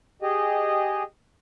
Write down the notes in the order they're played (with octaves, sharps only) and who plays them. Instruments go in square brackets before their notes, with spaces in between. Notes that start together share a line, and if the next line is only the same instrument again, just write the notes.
[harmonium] G4 G#4 D#5